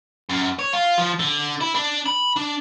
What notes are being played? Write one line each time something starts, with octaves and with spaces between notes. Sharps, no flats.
F#2
C#5
F4
F3
D3
E4
D4
B5
D4